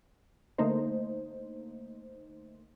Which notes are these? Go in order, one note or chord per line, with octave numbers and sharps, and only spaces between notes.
D3 A3 A#3 D#4 C5